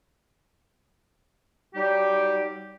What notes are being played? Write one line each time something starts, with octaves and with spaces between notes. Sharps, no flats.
F#3 G3 D#4 G4